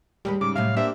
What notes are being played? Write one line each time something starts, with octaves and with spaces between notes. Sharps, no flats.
D#2 G3 G#3 B4
G#2 C#3 D6
A2 C3 F#3 E5 F5
A#3 D4 G4 C5 E5